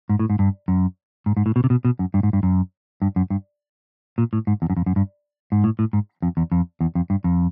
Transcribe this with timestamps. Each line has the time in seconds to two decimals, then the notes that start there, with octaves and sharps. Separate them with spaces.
0.09 G#2
0.19 A2
0.30 G#2
0.39 G2
0.68 F#2
1.26 G#2
1.37 G#2
1.46 A2
1.56 B2
1.64 C3
1.70 B2
1.85 B2
1.99 F#2
2.14 G2
2.23 G#2
2.33 G2
2.43 F#2
3.02 G2
3.16 F#2
3.30 G2
4.18 A#2
4.33 A2
4.47 G#2
4.62 E2
4.70 F#2
4.77 F2
4.86 F#2
4.96 G2
5.52 G#2
5.64 A2
5.79 A2
5.93 G#2
6.22 F2
6.37 E2
6.52 F2
6.81 E2
6.95 F2
7.10 G2
7.24 F2